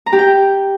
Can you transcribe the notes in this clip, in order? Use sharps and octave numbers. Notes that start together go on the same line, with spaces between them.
A#5
G4
G5